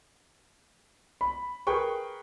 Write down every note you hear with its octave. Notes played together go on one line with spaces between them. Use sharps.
B5
G#4 A#4 B4 G5 C#6